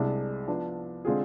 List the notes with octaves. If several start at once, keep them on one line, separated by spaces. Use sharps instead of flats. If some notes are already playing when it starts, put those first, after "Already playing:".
Already playing: C2 C3 G#3 D4
F3 B3 D4
D3 G#3 C4 F4 G#4